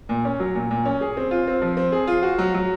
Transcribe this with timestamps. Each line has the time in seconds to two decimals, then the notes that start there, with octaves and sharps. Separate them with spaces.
0.09 A#2
0.25 C#4
0.40 F#3
0.55 A#2
0.71 A#2
0.85 C#4
1.01 G#4
1.17 C4
1.31 F4
1.47 C4
1.62 F3
1.77 C4
1.92 G#4
2.07 F4
2.23 F#4
2.38 F#3
2.54 F#3